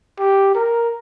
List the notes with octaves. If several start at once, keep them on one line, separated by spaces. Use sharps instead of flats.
G4
A#4